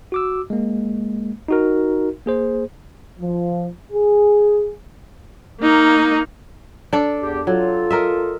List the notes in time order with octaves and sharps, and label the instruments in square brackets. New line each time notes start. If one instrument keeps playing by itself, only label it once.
[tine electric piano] F#4 D6 E6
G#3 A#3
D#4 F#4 A#4
A#3 G#4 C5
[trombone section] F3
G#4
[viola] A#3 D#4
[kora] D4 A4 D5
[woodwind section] E2 G4
[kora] F#3 [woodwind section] F4 A4
[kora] A#4 D#5 E5